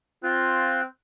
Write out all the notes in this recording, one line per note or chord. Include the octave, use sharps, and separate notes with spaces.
C4 F4 F#6